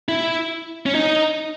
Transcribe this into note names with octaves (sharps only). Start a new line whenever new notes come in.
E4
C#4
D#4